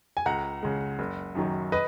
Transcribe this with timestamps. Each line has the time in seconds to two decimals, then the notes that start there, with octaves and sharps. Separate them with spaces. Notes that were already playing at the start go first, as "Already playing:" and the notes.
0.17 G#5
0.26 C#2 F#5 A#5
0.63 C#3 G#3
0.99 F#1
1.35 F#2 D#3 F#3
1.72 B4 D#5